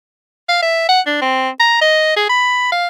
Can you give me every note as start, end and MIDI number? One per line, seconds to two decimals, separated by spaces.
0.49 0.61 77
0.62 0.84 76
0.89 1.00 78
1.06 1.17 62
1.21 1.49 60
1.60 1.80 82
1.81 2.15 75
2.16 2.27 68
2.29 2.69 83
2.72 2.88 77